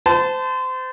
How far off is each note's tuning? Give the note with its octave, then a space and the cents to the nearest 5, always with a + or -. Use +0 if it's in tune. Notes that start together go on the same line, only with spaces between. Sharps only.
C5 -30 A5 -5